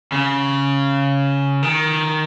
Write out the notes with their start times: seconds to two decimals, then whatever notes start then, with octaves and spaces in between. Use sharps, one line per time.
0.12 C#3
1.63 D#3